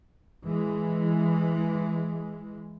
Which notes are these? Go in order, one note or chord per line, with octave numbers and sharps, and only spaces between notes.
E3 G#3